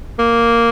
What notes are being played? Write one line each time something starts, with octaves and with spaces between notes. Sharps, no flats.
A#3